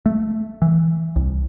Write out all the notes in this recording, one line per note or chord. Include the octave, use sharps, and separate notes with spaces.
A3
E3
C2